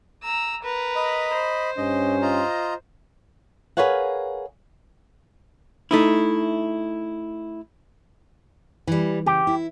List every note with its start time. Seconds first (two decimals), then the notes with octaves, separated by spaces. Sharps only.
0.23 A#5 E6
0.62 A#4 B4
0.96 D#5 B5
1.33 C5
1.77 G2 C#4 D#5
2.22 F4 D#5 A#5
3.77 G#4 A#4 B4 C#5 F5 F#5
5.91 A3 D#4 E4
8.87 E3 G3
9.26 C#3 G4
9.47 E4